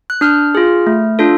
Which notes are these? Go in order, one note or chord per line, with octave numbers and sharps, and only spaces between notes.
F#6
D4 F6
F4 G#4
A3
D4 F4 A4